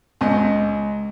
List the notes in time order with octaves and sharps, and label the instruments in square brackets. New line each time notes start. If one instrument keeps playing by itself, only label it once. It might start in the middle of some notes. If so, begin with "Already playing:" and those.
[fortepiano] C#2 D#5